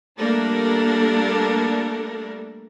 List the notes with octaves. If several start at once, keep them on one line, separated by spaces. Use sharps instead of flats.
G3 A3 A#3 D4 A4 A#4